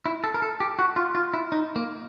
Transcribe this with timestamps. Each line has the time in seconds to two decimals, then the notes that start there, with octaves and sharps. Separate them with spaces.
0.06 E4
0.24 A4
0.34 A#4
0.42 A4
0.60 G4
0.79 F#4
0.96 F4
1.15 F4
1.34 E4
1.52 D#4
1.76 A#3